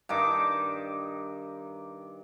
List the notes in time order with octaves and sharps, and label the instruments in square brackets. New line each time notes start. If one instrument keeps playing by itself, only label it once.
[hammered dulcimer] G2 D#3 D6